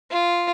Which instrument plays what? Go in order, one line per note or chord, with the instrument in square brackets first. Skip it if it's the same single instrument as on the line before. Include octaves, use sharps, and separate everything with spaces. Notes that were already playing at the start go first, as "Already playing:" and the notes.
[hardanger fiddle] F4